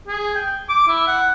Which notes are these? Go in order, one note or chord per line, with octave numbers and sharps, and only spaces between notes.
G#4
G5
D6
E4
F#5